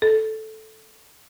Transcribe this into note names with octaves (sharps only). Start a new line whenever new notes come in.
A4